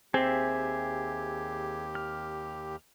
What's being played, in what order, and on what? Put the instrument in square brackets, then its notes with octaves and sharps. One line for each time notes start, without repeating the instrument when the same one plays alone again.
[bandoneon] D#2 G4 [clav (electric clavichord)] C4 [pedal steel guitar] G#4 E5
[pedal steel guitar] F6